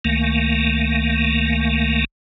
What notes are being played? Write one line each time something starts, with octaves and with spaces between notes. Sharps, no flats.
C#2 D#3 A3 A#3